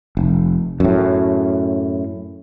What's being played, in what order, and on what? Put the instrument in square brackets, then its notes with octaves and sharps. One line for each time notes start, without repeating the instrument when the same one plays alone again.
[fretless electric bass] F1
F#2 A2